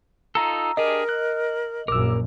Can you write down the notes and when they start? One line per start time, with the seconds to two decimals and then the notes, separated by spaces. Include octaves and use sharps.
0.35 D#4 F4 A4 A#5 E6
0.77 D4 G4 G#4 A#4 D#5
1.09 F#6
1.88 A#1 F#2 A#4 D6 E6